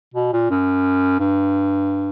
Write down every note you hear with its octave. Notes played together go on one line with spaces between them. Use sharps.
B2
A#2
F#2
G2